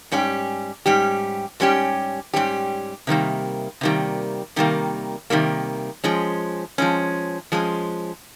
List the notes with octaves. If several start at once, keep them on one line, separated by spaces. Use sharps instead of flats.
G#2 G3 C#4 G4
G#2 G3 C#4 G4
G#2 G3 C#4 G4
G#2 G3 C#4 G4
C3 D#3 G3 A#3
C3 D#3 G3 A#3
C3 D#3 G3 A#3
C3 D#3 G3 A#3
F3 G#3 C#4
F3 G#3 C#4
F3 G#3 C#4